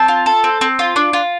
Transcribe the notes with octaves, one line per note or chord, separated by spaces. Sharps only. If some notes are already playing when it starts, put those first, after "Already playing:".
Already playing: C4 A5
F4
A4
C4
C4
F4
D4
F4